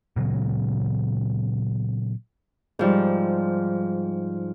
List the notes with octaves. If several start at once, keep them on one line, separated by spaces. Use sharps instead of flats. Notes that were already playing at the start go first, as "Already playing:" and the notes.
A#2 C#3 F#3 B3
G#2 F3 G3